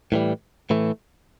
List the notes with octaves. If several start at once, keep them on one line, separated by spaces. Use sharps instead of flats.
A2 E3 G3
A2 E3 A3